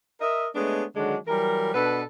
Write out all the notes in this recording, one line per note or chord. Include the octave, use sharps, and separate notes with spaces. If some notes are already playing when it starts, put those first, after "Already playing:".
A#4 D#5 E5
G#3 A3 B3 D4 C#5 D#5
D3 D#3 F#3 G#3 D4 F#4
E3 F#3 G3 A#4
B2 D4 A4 B4